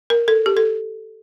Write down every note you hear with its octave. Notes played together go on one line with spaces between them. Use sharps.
A#4
A4
G4
A4